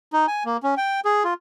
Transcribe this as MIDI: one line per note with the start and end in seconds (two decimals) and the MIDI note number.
0.13 0.26 63
0.27 0.43 80
0.45 0.57 58
0.63 0.75 61
0.77 1.00 79
1.05 1.23 68
1.24 1.34 65